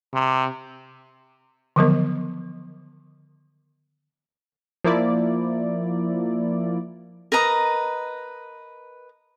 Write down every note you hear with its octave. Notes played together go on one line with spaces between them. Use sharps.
C3
D3 D#3 F3 F#3 B3 A#4
F3 A#3 E4 D5
A#4 B4 D#5 A#5